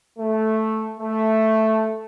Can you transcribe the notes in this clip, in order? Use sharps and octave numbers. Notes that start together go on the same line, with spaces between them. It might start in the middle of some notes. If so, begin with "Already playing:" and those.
A3
A3